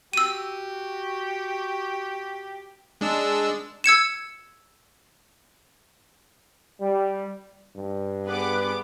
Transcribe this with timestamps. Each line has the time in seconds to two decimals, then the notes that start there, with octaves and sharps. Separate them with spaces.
0.13 F#4 G4 E6 D#7
3.01 G#3 D4 E6
3.84 E6 G#6 C#7 E7
6.80 G3
7.76 G2
8.27 B3 G#4 B4 D6